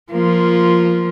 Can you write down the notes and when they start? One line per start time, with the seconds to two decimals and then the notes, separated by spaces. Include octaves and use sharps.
0.12 F3 A#3 F4